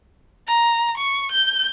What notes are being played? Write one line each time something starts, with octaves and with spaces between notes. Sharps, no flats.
A#5
C#6
G6